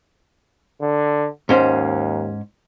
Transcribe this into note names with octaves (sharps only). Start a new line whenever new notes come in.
D3
D#2 G#2 C#4 C5